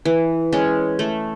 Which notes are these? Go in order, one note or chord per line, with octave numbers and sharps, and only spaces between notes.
E3
G#3 C#4
A3